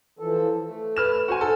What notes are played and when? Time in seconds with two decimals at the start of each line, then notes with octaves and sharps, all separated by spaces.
0.19 E3 F3 A4
0.65 A3
0.97 B4 F6 E7
1.28 F#4 C5 G#5
1.41 D#4 A4